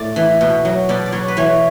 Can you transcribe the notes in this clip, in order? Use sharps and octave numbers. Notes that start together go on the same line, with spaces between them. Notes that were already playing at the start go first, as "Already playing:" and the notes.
Already playing: A2 D5
E3
B2
F#3
B2 D5
D5
F#3 C#5
B4
E3 C#5